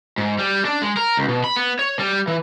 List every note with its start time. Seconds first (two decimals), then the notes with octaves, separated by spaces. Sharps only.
0.18 G#2
0.39 G3
0.65 D4
0.82 G#3
0.97 A#4
1.17 C#2
1.28 B2
1.44 B5
1.57 B3
1.79 C#5
1.99 G3
2.28 E3